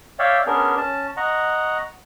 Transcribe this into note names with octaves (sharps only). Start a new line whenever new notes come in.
C#5 D5 E5 F5 G5
B3 C#4 D4 G#4 A#4
C#4 A5
D#5 F#5 A#5 C#6